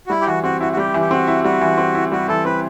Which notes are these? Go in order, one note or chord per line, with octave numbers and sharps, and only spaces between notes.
F#4
G3 E4
G4
E3 F#4
C4 F#4
E4 F#4
F#4
G3 G4
E3
G4
C4 F#4
E4
G3 F#4
E3
C4
E4
G3 F#4
E3 A4
C4 B4